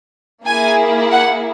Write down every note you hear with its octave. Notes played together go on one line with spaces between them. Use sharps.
A#3 E4 G#4 G#5
F#5